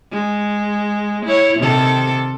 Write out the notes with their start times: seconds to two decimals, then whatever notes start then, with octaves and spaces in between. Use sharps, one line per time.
0.12 G#3
1.26 E4 C#5
1.58 C3 D#3 A4